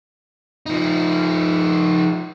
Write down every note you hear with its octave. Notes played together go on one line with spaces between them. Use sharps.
F3 D#4